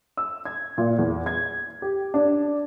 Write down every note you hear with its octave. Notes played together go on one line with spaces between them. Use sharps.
E6
G#6
A#2
E2
G#6
G4
D4